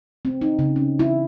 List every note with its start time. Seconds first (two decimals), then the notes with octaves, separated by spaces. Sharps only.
0.25 C4
0.41 D#4
0.59 C#3
0.76 C#4
0.99 E4